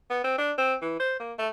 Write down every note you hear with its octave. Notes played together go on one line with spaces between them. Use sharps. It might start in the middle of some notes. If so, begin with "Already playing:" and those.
B3
C4
D4
C4
E3
C5
A#3
A3